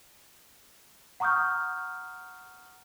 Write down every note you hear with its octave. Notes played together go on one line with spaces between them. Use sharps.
F#5 A#5 C#6 D#6 F6 G6